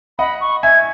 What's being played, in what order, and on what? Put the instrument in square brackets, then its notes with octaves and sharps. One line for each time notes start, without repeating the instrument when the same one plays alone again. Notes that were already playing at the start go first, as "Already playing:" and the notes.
[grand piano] D#5 F#5 [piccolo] B5
[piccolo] C#6
[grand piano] E5 G#5 [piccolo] G#6